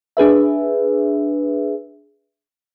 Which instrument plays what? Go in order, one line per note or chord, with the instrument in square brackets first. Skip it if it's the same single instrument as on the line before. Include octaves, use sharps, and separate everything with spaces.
[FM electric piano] D4 G#4 B4 E5